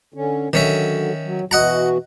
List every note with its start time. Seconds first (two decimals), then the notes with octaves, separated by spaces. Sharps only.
0.14 D3 C#4
0.53 D3 D#3 F#3 C#4 E5
1.24 F#3
1.51 B2 E3 F#4 D#5 F#5 A#5